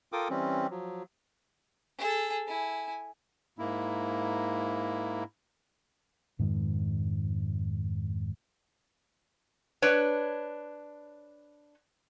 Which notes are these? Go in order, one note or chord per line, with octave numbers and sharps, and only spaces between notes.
F4 A4 A#4 G5 D6 D#6
E3 G3 C4 C#4
F3 F#3
G#4 A4
E4 G#5
G#2 A#3 E4
F2 G#2 D#3 G#3
D4 B4 C#5